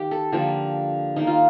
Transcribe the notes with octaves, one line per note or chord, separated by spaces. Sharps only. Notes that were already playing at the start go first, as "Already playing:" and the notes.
Already playing: D#3 G4
A4
D3 F3 A#3 G4
D#3 A#3 D#4
F4